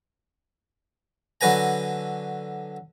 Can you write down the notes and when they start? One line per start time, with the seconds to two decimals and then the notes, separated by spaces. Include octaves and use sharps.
1.41 D3 F#3 B4 G#5 A#5